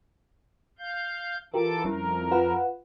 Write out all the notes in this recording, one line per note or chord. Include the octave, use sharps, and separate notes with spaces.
F5 G6
E3 F4 G4 A4 A#4 D6
F2 G3 C#4 E4 A#4
F4 B4 F#5